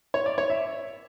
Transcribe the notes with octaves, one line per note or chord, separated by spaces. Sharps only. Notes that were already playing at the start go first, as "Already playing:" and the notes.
C#5
D5
C#5
E5